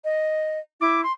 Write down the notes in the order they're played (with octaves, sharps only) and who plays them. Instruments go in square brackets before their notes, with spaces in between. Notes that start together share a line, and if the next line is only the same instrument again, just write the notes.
[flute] D#5
[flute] E4 [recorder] D6
[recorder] C6